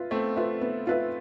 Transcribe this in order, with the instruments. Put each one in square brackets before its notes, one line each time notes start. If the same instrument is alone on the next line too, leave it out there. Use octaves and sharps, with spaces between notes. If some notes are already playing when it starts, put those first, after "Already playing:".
Already playing: [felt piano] F4 B4 E5
[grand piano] A3 C4 [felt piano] B3
[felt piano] F4 B4 E5
B3
F4 B4 E5